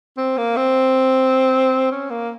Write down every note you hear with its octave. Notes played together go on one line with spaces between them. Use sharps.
C4
A#3
C4
C#4
A#3